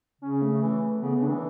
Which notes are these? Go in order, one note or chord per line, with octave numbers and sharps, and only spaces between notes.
C#3 C#4
A3
E3
C#3 B3
C#3
D4
E3